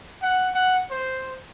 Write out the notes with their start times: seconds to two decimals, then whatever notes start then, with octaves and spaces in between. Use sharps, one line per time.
0.22 F#5
0.54 F#5
0.91 C5